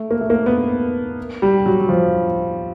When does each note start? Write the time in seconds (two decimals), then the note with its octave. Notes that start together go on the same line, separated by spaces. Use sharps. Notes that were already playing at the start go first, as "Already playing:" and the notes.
Already playing: A3
0.11 A#3
0.21 A3
0.30 A#3
0.46 B3
1.42 G3
1.66 F#3
1.81 F#3
1.89 F3